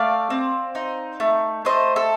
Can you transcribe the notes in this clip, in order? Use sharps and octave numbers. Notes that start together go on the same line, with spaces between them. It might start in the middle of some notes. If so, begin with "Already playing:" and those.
Already playing: A3 D5 F5
C4
D#4
A3
A3 C5 D#5
A4